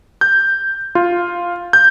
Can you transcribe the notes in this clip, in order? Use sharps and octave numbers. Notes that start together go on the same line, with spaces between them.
G6
F4
G6